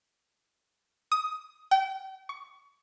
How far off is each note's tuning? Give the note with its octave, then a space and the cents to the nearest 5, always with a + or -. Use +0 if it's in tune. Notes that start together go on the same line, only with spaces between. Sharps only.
D#6 +15
G5 -35
C#6 +25